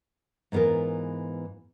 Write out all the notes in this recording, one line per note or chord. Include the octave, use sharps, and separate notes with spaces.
G#2 E3 B3 F4 A#4